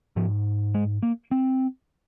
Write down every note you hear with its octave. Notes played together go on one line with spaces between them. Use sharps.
G#2 F3
G#3
A#3
C4